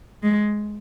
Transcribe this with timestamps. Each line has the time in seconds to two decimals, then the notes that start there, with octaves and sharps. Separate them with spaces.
0.23 G#3